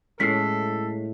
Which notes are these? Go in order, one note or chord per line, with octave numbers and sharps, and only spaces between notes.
A2 G#3 C#4 A4 B6 C7